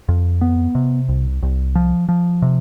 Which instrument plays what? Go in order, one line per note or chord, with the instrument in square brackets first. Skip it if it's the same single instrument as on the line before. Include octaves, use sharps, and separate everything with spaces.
[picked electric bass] F2
B3
C3
C2
C2
F3
F3
C3